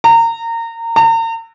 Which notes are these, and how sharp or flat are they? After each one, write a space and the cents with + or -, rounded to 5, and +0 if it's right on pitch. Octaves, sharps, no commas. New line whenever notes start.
A#5 -25
A#5 -40